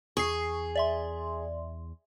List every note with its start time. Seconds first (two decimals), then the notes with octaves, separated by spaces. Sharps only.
0.17 E2 G#4 C#6 C7
0.76 D5 E5 C6